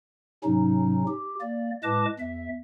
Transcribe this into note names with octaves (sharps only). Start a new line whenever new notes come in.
G#2 C3 F#3 C#4 D#4
G4
A#3 D5
A2 G#3 B4 D#5 A5 D6
E2 E5